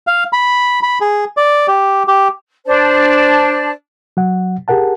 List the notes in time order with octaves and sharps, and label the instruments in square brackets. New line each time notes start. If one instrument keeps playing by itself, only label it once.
[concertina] F5
B5
B5
G#4
D5
G4
G4
[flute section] D4 C5 D5 A5
[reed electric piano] F#3 F#5
G4 G#4 A#4 F#5 A5